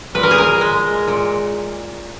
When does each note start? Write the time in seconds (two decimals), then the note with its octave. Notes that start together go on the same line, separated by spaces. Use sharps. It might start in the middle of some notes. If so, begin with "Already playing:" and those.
0.15 A#2 B4
0.23 A#4
0.31 G#4
0.38 A#4
0.61 G#3
1.08 A#2